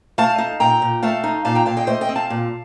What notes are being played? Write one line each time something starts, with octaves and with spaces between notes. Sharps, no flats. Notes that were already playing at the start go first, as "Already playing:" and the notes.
A3 F5 A5
D#4
A#2 G5 A#5
A#2
A3 F5 A5
D#4
A#2 F5 A5
G5 A#5
A#2 F5 A5
D#5 G5
A3 C5 D#5
D#5 G5
C4
F5 A5
A#2